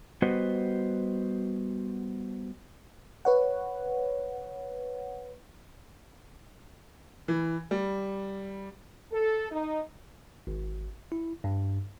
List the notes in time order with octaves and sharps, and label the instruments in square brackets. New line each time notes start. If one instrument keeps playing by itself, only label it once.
[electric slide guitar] G3 B3 F#4 B4 C5 D#5
[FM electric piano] B4 C#5 F#5
[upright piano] E3
G3
[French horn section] A4
D#4
[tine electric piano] G#1
E4
G2